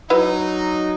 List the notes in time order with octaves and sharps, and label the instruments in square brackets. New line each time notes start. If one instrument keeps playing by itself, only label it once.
[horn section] F#3 D#4 [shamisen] E4 F#4 B4